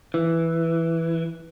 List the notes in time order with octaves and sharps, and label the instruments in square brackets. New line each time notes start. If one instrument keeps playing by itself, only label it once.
[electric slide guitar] E3